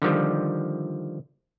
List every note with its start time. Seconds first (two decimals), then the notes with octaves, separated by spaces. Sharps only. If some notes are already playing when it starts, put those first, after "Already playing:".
0.02 D3 D#3 F3 G3